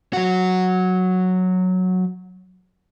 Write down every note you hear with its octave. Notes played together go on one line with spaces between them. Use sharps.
F#3 F#4